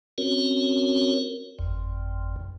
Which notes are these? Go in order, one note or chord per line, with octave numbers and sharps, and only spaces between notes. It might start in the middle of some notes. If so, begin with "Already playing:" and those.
C4 C#4 F#4 A#4 C#5
G1 F2